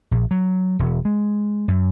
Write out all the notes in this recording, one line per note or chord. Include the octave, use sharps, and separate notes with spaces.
A#1
F#3
E1
G#3
F#2